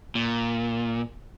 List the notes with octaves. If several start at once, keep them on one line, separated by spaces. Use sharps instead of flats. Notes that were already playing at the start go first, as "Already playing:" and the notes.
A#2